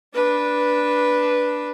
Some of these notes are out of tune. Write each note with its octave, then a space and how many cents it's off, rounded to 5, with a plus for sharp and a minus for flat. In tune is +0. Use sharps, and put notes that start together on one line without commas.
D4 +0 B4 -10